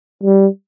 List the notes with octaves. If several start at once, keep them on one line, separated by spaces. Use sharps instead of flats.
G3